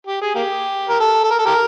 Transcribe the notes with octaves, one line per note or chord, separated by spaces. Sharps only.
G4
G#4
A#3 G4
A#4
A4
A4
A#4
A4
G4 A#4